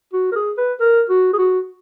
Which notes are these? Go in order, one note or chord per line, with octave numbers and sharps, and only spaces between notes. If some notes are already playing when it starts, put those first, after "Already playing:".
F#4
A#4
G#4
B4
A#4
F#4
G#4
F#4